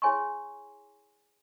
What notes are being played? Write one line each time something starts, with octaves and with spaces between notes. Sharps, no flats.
E4 G#4 C#5 G#5 C6 C#6